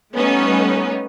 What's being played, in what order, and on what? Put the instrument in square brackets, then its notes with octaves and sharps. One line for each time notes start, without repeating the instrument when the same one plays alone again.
[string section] G3 A3 B3 C#4 D#4